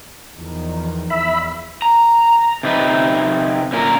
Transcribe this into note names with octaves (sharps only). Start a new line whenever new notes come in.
E2 D#3 F3
E2 E5 B5
A#5
C3 D#4 B4
A#2 D3 C#4 A#4